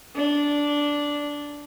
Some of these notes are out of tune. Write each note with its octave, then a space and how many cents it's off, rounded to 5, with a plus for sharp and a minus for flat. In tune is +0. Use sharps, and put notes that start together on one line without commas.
D4 -10